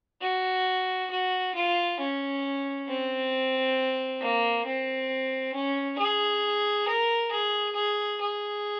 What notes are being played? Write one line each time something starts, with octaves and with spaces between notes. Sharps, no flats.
F#4
F#4
F4
C#4
C4
A#3
C4
C#4
G#4
A#4
G#4
G#4
G#4